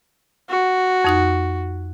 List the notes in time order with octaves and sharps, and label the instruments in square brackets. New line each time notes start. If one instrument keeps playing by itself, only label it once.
[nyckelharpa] F#4
[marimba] F2 D#4 F#6